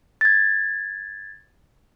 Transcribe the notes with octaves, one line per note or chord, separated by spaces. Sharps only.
G#6 A6